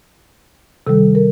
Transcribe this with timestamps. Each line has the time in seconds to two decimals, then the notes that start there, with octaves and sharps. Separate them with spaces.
0.87 C3 D#3 G3 A4
1.15 A#4